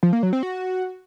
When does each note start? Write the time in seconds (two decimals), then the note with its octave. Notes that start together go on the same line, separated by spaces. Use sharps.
0.03 F3
0.13 A#3
0.23 F#3
0.33 C4
0.43 F#4